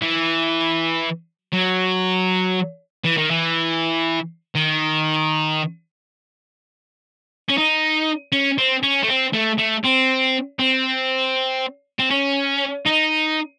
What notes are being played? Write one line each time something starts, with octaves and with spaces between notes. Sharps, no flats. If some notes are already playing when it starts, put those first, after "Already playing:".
E3
F#3
E3
D#3
E3
D#3
C#4
D#4
C#4
C4
C#4
A3
C4
A3
A3
C4
C4
C4
C#4
D#4